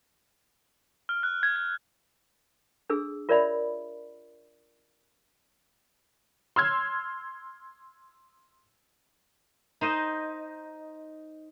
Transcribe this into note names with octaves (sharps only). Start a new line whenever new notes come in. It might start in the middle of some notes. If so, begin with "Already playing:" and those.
F6
F#6
G#6
G#6
D4 G#4 A4 E6
F4 A#4 C#5 D5 E5 B5
C6 E6 F6 G#6
D#4 C5 D#5